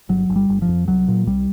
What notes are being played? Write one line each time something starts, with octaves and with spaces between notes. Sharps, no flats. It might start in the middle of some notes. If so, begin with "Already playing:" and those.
G1 F#3
G1
G3
G1
F3
F2
C2 F#3
A#2
C2 G3